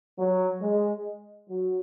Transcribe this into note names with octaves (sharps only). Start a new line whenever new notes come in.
F#3
G#3
F#3